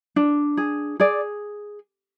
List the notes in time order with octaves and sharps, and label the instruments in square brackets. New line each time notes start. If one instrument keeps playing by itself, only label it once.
[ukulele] D4
G#4
G#4 D5